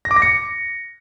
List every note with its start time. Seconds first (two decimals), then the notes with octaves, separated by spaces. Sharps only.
0.05 A#6
0.11 D6
0.16 A#6
0.22 C#7